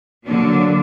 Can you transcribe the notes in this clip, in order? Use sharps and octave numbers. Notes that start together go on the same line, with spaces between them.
D3 F#3 A#3 D4